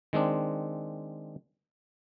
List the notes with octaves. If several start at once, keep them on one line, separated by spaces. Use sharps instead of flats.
D#3 G#3 C4 D4